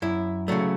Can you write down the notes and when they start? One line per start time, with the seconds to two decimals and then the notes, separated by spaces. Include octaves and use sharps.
0.02 F#2 E4
0.48 C#3 F#3 A3